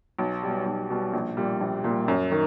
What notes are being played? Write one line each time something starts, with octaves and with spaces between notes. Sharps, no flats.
B1
B2 G3
B1
B2 G3
A#1
A#2 G3
A#1
A#2 G3
F#2
D#3